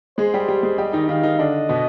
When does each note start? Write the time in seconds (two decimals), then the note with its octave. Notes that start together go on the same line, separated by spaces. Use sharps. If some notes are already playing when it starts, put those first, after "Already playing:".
0.18 G#3 G#4 C5
0.34 G3 G4
0.48 G3 G4
0.63 G#3 G#4
0.78 G3 G4 D#5
0.93 D#3 D#4
1.09 D#3 D#4 F5
1.23 D#3 D#4
1.39 D3 D4 D#5
1.69 B2 B3